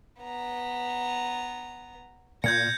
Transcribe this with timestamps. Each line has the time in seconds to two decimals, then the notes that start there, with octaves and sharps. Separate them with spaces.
0.21 B3 A#5
2.44 A#2 G6 G#6 A#6 C#7